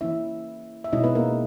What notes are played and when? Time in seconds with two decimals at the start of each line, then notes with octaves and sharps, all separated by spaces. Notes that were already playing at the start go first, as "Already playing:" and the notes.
0.01 E3 A#3 C#4 E4 E5
0.84 E5
0.92 B2 G#3 C#4 D#4 E4 D#5
1.04 B3 B4
1.15 A#3 A#4